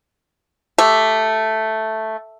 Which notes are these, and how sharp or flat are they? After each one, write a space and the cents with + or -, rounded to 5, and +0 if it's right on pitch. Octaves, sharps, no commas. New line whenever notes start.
A3 +0 G4 +0